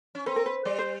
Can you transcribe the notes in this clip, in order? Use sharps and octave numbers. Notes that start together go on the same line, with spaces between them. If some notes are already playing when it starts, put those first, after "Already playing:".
C#4
C4 B4
A#4
B4
G3 D5
C5